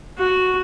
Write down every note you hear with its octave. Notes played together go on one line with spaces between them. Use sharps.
F#4